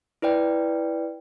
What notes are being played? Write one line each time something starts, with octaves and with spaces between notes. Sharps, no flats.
E4 B4 D5 G5